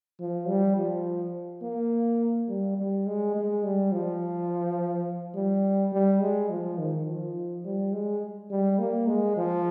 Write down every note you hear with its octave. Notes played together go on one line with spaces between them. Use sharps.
F3
G3
F3
A#3
G3
G3
G#3
G#3
G3
F3
G3
G3
G#3
F3
D#3
F3
G3
G#3
G3
A#3
G#3
F3